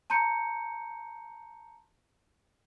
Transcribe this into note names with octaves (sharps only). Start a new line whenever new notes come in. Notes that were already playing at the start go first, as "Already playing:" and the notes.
A5 A#5 C6 G6 C#7